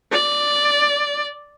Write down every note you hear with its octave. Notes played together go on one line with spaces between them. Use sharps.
D5